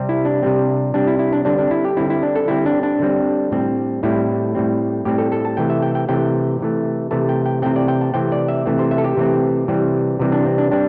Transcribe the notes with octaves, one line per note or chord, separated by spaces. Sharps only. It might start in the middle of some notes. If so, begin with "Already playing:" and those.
Already playing: C3 G3 C4
E4
D4
C3 G3 C4
C3 G3 C4 D4
E4
E4
D4
D3 G3 C4 D4
D4
E4
G4
D3 G3 C4 E4
E4
D4
A4
D3 G3 C4 E4
D4
D4
D3 G3 C4
A2 G3 C4
A2 G3 C4 E4
A2 G3 C4
A2 G3 C4 G4
A4
A4
A5
C3 E3 A3 G5
E5
G5
G5
C3 E3 A3 G5
C3 E3 A3
C3 E3 A3 A5
G5
G5
C3 E3 A3 C4 G5
D5
G5
A5
C3 E3 A3 C4 G5
D5
E5
C3 E3 A3 C4
C5
E5
A4
G4
C3 E3 A3 C4
C3 E3 G3 C4
C3 E3 G3 C4
D4
C4
D4
G3 C4 D4